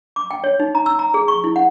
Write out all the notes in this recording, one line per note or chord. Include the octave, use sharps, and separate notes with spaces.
D6
G5
C#5
D#4
A#5
E6
A#5
G#4
C#6
E4
F#5